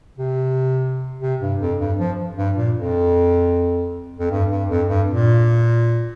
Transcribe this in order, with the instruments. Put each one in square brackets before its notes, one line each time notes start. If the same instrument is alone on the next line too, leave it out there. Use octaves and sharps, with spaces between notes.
[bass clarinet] C3
C3
G2
F2
G2
F3
G2
A#2
F2
F2
G2
G2
F2
G2
A#2